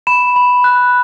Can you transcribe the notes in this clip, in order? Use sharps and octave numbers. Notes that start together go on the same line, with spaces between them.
B5 E7
B5
F#6